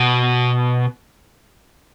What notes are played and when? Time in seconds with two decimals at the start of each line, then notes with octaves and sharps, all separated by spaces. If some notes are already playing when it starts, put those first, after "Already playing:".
Already playing: B2